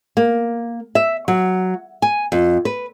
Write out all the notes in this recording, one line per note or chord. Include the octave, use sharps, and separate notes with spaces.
A#3
E5
F#3
G#5
F2
B4